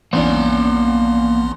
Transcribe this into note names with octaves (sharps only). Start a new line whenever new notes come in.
A#1 E2 A#3 B3 C#4 D4 F#5 C6